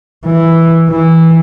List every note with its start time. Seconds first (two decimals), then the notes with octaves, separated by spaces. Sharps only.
0.25 E3
0.89 E3